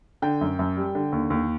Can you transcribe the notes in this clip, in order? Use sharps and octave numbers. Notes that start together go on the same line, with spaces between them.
D3 G5
F#2
F#2
G3
D3
D#2
D#2